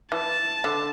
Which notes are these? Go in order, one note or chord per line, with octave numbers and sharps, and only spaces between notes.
E3 A5
D3